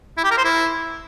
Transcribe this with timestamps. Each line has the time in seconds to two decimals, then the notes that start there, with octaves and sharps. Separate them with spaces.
0.17 E4
0.24 G4
0.31 A#4
0.37 C5
0.44 E4